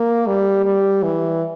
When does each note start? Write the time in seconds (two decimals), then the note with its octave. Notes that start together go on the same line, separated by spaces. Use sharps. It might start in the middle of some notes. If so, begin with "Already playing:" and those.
Already playing: A#3
0.27 G3
0.65 G3
1.03 E3